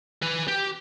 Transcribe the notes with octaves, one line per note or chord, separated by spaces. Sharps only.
B4 G#5
G4